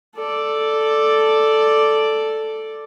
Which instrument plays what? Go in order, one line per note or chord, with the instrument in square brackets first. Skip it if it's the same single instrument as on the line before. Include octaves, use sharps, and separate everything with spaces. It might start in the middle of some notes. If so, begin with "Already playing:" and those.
[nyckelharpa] A4 D5